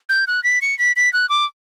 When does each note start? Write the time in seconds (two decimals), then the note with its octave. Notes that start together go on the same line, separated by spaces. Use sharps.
0.09 G6
0.27 F#6
0.44 B6
0.62 C#7
0.79 B6
0.96 B6
1.13 F#6
1.29 D6